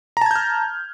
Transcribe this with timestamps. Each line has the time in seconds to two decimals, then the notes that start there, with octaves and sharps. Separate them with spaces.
0.17 A#5
0.21 A5
0.26 G#6
0.31 G6
0.35 F6